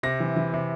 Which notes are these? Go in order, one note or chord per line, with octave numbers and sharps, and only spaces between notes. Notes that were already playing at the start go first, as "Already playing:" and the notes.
C3 A#6
E3
E3
C3